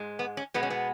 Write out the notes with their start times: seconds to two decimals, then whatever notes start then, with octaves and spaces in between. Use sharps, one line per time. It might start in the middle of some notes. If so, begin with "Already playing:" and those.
Already playing: G#2 G#3
0.19 B3
0.37 C#4
0.54 B2 G#3 B3
0.63 C#4
0.70 B3